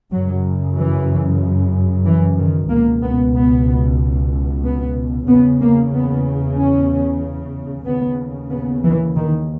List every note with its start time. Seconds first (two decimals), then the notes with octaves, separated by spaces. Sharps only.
0.12 F#2 C#3 F#3
0.77 E3
2.05 E3
2.38 D#3
2.70 C#2 B2 A#3
3.03 B3
3.35 B3
4.64 B3
5.28 E2 C#3 B3
5.61 A#3
5.93 B3
6.57 C#4
7.86 D#2 C#3 B3
8.51 B3
8.84 E3
9.15 D#3